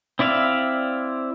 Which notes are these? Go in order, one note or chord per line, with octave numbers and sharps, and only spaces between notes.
C4 E4 D5 E5 F5